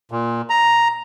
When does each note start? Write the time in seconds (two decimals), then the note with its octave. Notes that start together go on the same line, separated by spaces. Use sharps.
0.12 A#2
0.50 A#5